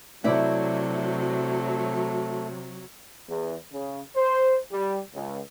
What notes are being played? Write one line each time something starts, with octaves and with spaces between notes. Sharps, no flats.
C3 F#3 A3 E4 D5 E5
E2
C#3
C5
G3
C#2